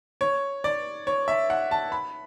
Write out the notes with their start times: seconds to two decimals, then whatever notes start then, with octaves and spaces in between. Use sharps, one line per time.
0.21 C#5
0.64 D5
1.07 C#5
1.28 E5
1.50 F#5
1.71 A5
1.92 B5